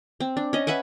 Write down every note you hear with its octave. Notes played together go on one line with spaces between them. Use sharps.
C4
D4
C#4 D#5
B4 E5 F#5 G#5